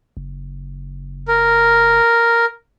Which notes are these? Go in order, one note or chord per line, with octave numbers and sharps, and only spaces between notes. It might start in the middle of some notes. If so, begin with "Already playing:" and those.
F#1
A#4